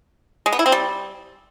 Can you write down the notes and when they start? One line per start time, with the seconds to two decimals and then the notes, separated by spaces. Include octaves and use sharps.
0.46 G#3
0.52 B3
0.59 E4
0.66 C4
0.72 G3